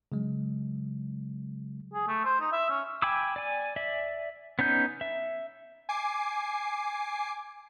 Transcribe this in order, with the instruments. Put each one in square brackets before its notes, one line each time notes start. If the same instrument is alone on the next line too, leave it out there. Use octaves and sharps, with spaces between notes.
[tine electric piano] C#3 F#3 G#3
[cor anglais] G#4
A3
C5
D#4
E5
C#4
[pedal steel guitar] G5 G#5 B5 D6 E6
D5 G#5
D5 E5
B3 C#4 D#4 G6
E5
[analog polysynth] G#5 D6 C7